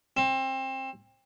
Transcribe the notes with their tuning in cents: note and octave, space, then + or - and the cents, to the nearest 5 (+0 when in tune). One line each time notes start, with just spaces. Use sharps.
C4 +25